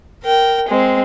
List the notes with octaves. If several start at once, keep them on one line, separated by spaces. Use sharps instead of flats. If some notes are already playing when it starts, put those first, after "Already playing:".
A#4 G5
G#3 C4